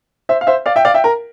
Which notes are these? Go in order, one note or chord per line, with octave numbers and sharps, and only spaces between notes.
C5 E5
F5
C5 E5
D5 F5
E5 G5
D5 F5
E5 G5
A#4